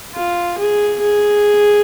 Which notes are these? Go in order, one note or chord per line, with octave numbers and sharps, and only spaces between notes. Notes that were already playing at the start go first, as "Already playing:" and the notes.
F4
G#4
G#4